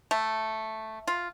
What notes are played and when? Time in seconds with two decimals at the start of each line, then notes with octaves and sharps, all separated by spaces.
0.11 A3
1.07 F4